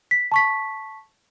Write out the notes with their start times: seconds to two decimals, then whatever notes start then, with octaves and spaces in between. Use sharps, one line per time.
0.11 B6
0.32 A5 C#6 B6